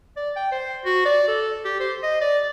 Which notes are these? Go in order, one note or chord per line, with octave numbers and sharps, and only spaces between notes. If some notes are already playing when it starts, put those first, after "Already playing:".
D5
G5
C5
F#4
D5
A4
G4
C5
D#5
D5